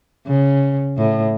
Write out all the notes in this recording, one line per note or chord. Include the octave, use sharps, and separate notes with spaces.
C#3
A2